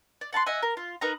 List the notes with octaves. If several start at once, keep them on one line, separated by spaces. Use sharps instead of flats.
D5
F#5 A5 B5 C6
D#5 E5 F#5 G#5
A#4
F4
D#4 A#4 B4 A#5